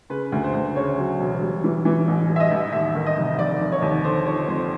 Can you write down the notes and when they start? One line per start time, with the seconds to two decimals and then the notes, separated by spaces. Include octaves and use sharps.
0.10 C#3 B4
0.32 D2
0.44 C5
0.54 D2
0.76 C#3 C#5
0.98 F#3
1.20 E1
1.41 G3
1.64 E3
1.85 E3
2.08 A1
2.29 G3
2.36 E5
2.40 D#5
2.51 A1
2.72 D#2 E5
2.95 D#3
3.06 D#5
3.17 F1
3.39 F1 D5
3.60 F1
3.72 C#5
3.82 D#2
4.04 D3 C5
4.26 F3 C#5
4.48 F2 C5